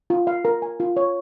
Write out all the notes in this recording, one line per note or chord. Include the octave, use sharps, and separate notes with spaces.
F4
F5
A#4
G#5
F4
C#5